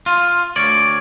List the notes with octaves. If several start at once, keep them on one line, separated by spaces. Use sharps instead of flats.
F4
D2 C#5 D5